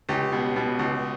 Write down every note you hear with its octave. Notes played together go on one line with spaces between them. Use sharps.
C#2 G4
B2
B2
C#2